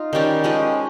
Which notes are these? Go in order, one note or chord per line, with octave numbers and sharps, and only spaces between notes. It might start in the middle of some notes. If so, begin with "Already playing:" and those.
Already playing: D#4 F4
D#3 G3 C#4 G4
F3 G#3 C#4 G4